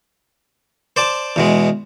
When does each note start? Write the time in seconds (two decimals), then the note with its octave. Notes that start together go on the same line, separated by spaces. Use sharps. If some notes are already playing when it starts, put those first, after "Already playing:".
0.96 C5 D5 A5
1.36 E2 B2 G#3